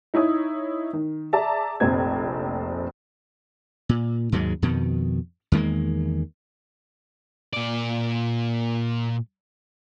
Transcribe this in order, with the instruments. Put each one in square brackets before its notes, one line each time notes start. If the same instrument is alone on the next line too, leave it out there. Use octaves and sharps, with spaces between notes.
[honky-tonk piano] D#4 E4 C#5 D#6
D#3
G#4 D5 E5 A5 A#5
F1 A#1 C4 G#6
[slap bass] A#2
D#2 G#2 F#3 G#3
F2 B2 D#3
E2 D#3 G#3 A#3
[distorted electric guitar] A#2 D5